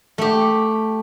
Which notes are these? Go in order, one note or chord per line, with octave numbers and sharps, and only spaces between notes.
A3 G4